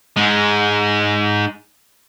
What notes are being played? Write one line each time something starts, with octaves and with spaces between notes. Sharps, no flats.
G#2 G#3